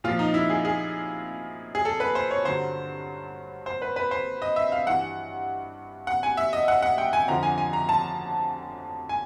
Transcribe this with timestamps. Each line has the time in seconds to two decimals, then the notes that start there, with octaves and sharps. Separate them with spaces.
0.04 A#2 F3 F4
0.19 D#4
0.34 E4
0.50 G#4
0.65 G#4
1.75 G#4
1.85 A4
2.00 B4
2.15 C5
2.31 C#5
2.45 G2 D3 F#3 C5
3.66 C5
3.82 B4
3.96 B4
4.11 C5
4.42 D#5
4.56 E5
4.72 F5
4.87 G2 E3 F#5
6.07 F#5
6.23 G#5
6.37 E5
6.53 D#5
6.68 F#5
6.82 F#5
6.98 G5
7.13 G#5
7.28 F2 D3 F3 A#5
7.43 G#5
7.58 G#5
7.73 A#5
7.89 A5
9.09 G#5